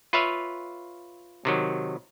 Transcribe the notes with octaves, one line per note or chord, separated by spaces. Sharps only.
F4 B4 C#5 E5 F5
C3 D#3 F#3